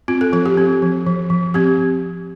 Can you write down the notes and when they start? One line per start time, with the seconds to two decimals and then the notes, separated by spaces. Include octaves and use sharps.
0.08 C4 F4
0.21 A4
0.33 F3 A4
0.46 G4
0.57 C4
0.82 F3
1.07 F3
1.30 F3
1.54 C4 G4